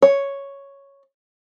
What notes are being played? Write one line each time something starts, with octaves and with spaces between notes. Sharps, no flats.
C#5